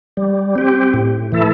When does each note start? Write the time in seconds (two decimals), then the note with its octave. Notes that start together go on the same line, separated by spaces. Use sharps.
0.17 G3
0.55 C4 G4
0.94 A2
1.32 E3 A3 E4 A4